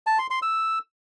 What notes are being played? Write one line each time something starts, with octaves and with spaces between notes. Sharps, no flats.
A5
C6
C6
E6